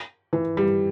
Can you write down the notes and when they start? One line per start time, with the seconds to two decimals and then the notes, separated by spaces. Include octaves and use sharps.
0.33 E3
0.57 G3